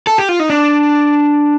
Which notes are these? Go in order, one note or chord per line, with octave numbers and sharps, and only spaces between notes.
A4
G4
F4
D#4
D4